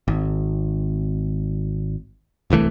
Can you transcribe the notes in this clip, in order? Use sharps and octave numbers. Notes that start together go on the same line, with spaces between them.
G#1
D1 C2 E3 A3